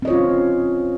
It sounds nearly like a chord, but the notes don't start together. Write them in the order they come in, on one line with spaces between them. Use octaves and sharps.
C4 D#5 C#5 F4 C#4